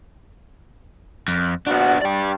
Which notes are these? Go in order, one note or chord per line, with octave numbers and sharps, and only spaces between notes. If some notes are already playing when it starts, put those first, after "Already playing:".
F2
A#1 B3 D4 F#4
G2 D5 G5